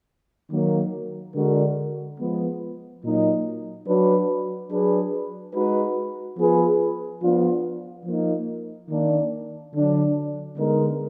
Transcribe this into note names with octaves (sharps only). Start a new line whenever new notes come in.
D#3 F#3 A#3
D3 G#3 D4 F#4 A#4
F3 G#3 B3
A#2 F#3 A#3 D#4
F#3 D4 F#4 B4
F#3 D4 G#4 B4
G#3 D#4 F#4 B4
F3 B3 F4 G#4 B4
F3 B3 D4 F4
F3 A#3 D#4
D#3 A#3 D4
D3 F#3 D4
D3 G#3 B3 D#4 A#4